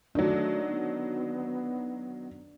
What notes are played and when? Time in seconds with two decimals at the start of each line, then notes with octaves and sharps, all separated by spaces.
0.15 D#3 F#3 A3 D4
0.69 B3